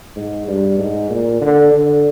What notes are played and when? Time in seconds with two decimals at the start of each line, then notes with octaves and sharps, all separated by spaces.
0.16 G#2
0.48 G2
0.79 G#2
1.10 A#2
1.41 D3
1.72 D3